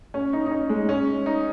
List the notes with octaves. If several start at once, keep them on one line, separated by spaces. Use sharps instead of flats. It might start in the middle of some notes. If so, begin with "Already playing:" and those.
C#4
D#4
D#4
C#4
G#3
C#4
D#4